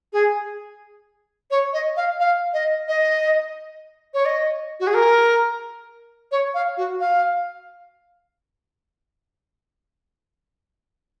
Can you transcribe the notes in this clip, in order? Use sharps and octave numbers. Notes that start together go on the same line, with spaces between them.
G#4
C#5
D#5
F5
F5
D#5
D#5
C#5
D#5
F#4
G#4
A#4
C#5
F5
F#4
F5